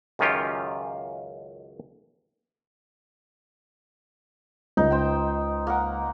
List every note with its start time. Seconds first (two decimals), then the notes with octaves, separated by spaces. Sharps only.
0.19 C#2 F#2 D#3 C#4 F4 G4
4.77 C#2 D#4
4.91 C5 G5
5.67 A#3 A#4 F#5